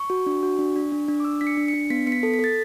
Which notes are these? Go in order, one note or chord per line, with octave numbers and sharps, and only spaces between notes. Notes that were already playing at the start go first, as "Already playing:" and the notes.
Already playing: C#6
F#4
D4
F#4
D4
D4
D4
D4
D6
D4 E6
D4 B6
C#7
D4
C#7
D4
B3 B6
B3 C#7
B6
A4
B6
A4 A6